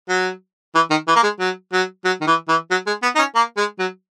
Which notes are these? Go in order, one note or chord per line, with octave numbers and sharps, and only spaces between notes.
F#3
E3
D#3
E3
A#3
G#3
F#3
F#3
F#3
D#3
E3
E3
F#3
G#3
B3
D#4
C#4
A#3
G#3
F#3